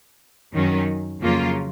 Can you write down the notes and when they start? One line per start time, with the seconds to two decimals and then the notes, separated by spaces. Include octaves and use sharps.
0.53 F#2 D#3 F#3 C#4
1.20 F2 C#3 F#3 A#3 F4